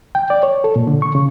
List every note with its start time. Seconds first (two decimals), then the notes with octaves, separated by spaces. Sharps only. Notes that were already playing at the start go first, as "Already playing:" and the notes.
0.15 G5
0.30 D5
0.43 C#5
0.64 A4
0.76 A#2
0.87 D3
1.02 C#6
1.15 C#3